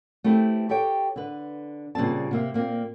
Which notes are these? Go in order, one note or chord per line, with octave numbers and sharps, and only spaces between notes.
A3 C4 E4 G4 B4
G4 A4 C#5 G5
D3 B4
A#2 C#3 G3 C4 A5
C3 A#3 E5
A#2 A#3 C4